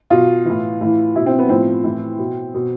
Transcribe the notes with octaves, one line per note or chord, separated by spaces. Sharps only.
B2 F4
A2 E3
A2 E3
B2 E4
C4
B3
A2 F3 C4
A2 E3
B2
B2